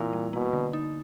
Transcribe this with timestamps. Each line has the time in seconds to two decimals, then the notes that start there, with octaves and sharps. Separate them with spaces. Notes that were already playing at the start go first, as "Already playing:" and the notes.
Already playing: A#2 E3 C4 E4
0.13 G3
0.33 B2 A#3
0.53 D3
0.73 D#4